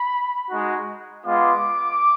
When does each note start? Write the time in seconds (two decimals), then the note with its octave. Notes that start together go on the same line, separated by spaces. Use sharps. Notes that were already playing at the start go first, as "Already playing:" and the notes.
Already playing: B5
0.49 G#3 D#4 F#4
1.25 G#3 B3 F4 D6